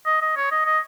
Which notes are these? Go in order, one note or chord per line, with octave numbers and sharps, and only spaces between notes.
D#5
D#5
C#5
D#5
D#5